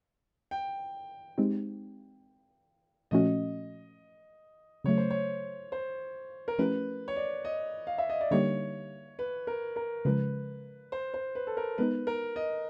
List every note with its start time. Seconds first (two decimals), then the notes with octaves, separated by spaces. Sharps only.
0.51 G5
1.38 G#3 C4 D#4 G4
3.11 A#2 F3 A3 C#4 F#4 D#5
4.84 C#3 F#3 A3 C#5
4.97 C5
5.10 C#5
5.72 C5
6.48 A#4
6.58 F3 A3 C#4 E4 G4 B4
7.08 C#5
7.16 D5
7.45 D#5
7.87 F5
7.98 E5
8.10 D#5
8.21 D5
8.31 D3 G3 A#3 D#4 G4 C#5
9.19 B4
9.47 A#4
9.76 A#4
10.05 C#3 F3 G#3 B4
10.92 C5
11.14 C5
11.35 B4
11.47 A4
11.57 A#4
11.78 G#3 B3 D#4 B4
12.07 A#4
12.36 D#5